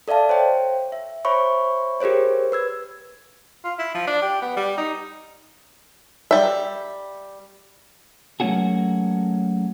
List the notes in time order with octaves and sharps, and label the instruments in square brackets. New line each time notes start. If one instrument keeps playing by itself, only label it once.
[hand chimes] A4 D5 E5 F5 A5
C5 C#5 G5
E5
C5 C#5 E5 B5 C#6
G4 G#4 A#4 C5 C#5
B4 E6 G#6
[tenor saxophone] F4
E4
F3
D4
G4
B3
G3
D#4
[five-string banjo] G3 E5
[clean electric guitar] F#3 A3 A#3 C#4 F#4 G#4